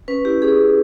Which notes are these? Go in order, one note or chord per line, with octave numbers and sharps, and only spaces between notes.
C#4 B4
E4 G4
C#4 G#4
C#4